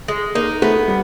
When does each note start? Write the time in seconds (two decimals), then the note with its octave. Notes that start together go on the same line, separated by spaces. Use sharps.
0.08 G#3
0.35 A#3 D#4
0.62 A3 B3
0.88 G3